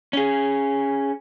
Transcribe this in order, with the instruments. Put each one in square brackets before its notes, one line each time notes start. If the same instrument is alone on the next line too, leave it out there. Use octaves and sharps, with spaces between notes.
[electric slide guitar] C#4 G#4